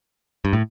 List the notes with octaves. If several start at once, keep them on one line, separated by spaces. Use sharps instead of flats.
G2
A2